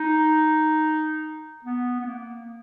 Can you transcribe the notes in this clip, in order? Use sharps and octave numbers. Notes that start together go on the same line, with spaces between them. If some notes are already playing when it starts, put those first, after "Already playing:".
Already playing: D#4
B3
B3
A#3